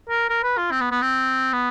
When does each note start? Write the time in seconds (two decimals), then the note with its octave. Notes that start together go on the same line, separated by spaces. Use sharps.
0.09 A#4
0.30 A#4
0.43 B4
0.58 F4
0.71 C4
0.81 B3
0.92 B3
1.02 C4
1.53 B3